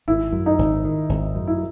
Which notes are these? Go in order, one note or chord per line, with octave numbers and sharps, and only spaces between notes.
G#1 E4
F#2
D#4
G#1
D#3
G#1
F#2
E4